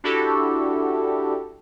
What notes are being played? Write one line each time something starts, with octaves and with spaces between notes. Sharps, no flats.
D4 E4 F#4 G4 A4